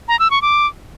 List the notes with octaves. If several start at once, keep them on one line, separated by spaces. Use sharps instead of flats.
A#5
E6
C#6
D6